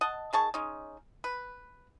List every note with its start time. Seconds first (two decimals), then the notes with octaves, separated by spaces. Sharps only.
0.01 D#5 F#5 A5
0.33 D#3 G#4 A5 C#6
0.54 G#3 C#4 D#4
1.24 B4